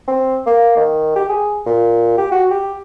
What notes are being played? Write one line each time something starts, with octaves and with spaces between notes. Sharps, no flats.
C4
A#3
D#3
G4
G#4
A#2
G4
F#4
G4